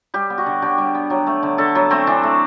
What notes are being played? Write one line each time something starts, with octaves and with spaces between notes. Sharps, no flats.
G3 G4
B3
F#4
D3
D3 G4
G3
B3
F#3
A3
D3
D3 A4
F#3 B3
A3 C4
E3 D4
A3